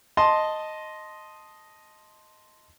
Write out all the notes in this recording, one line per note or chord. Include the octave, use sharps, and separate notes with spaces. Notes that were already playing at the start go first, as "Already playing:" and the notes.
D#5 A5 C6